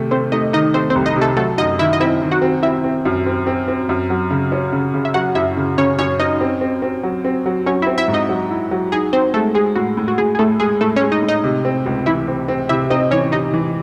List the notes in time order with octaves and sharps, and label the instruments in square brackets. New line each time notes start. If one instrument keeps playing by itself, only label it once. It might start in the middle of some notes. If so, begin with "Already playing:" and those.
Already playing: [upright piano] C3 D#3 A3
[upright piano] A3 [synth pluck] C4 C5
[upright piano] A3 [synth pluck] D#4 D#5
[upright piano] D#3 [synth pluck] D#4 D#5
[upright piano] A3 [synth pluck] C4 C5
[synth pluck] C4 C5
[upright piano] C2
[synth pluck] D#4 D#5
[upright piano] C3
[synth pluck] A3 A4
[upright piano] F#3 [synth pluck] A3 A4
[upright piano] F#2 [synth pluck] D#4 D#5
[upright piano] D#3 [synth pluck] E4 E5
[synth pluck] D#5
[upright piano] C4 [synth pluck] E4 E5
[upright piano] D#3
[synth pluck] F#4 F#5
[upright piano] C4
[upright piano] C4 [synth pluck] E4 E5
[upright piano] C4
F#2
C4
C4
C4
F#2
F#3
C#3
C#4
C#3
C#3
[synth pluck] E5
[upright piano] F#3 [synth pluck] F#4 F#5
[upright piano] F#2 [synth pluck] E4 E5
[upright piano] C#3
[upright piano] C#3 [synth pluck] C#4 C#5
[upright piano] F#2 [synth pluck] C#4 C#5
[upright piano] C#4 [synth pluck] D#4 D#5
[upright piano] C4
C4
C4
F#3
C4
F#3
[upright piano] F#3 [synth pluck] C#4 C#5
[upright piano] C4 [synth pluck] E4 E5
[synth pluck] E4 E5
[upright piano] G#2
[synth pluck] D#4 D#5
[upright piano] F#3
E4
F#3
[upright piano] D#4 [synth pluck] G#4
[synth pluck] C4 C5 [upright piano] D#4
[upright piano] G#3 [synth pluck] A3 A4
[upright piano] G#3 [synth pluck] G#4
[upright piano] A2 [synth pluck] F#4
[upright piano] A2
[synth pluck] F#4
[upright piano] A2 [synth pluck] G#4
[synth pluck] G#4
[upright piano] A2 [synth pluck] A3 A4
[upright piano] G#3 [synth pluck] G#4
[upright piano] A2 [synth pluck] A3 A4
[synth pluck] C#4 C#5
[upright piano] G#3
[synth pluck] D#4 D#5
[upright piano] A2
[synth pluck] D#4 D#5
[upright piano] C3
C4
C#2
[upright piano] E3 [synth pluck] E4 E5
[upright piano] C4
C4
[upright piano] C3 [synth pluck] E4 E5
[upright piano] C4 [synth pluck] D#4 D#5
[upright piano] E3 [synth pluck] C#4 C#5
[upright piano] C3 [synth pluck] D#4 D#5
[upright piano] E3